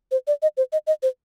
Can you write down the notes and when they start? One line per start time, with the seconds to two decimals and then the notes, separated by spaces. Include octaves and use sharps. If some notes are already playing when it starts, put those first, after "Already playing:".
0.11 C5
0.27 D5
0.42 D#5
0.57 C5
0.72 D#5
0.87 D#5
1.03 C5